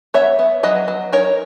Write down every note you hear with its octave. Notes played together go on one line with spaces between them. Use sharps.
B3 C#5 E5
B3
F#3 B4 D#5
F#3
D#4 A#4 C#5